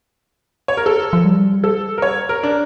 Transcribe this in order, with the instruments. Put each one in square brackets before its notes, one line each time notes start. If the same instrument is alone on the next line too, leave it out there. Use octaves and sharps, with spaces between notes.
[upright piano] C#5
A#4
A4
[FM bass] F3
G3
[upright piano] A4
A#4
C#5
A#4
D4